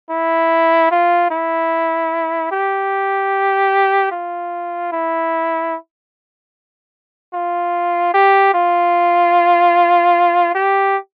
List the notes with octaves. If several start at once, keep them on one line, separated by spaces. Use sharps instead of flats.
E4
F4
E4
G4
F4
E4
F4
G4
F4
G4